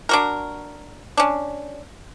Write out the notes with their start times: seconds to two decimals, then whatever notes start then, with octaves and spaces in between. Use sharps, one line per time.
0.09 D4 F#4 A#4
1.17 C#4 D4